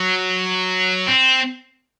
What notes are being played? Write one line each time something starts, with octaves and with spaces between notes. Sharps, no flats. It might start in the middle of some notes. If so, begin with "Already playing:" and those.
Already playing: F#3
C4